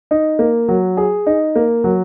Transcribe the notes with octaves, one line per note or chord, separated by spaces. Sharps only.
D#4
A#3
F#3
G#4
D#4
A#3
F#3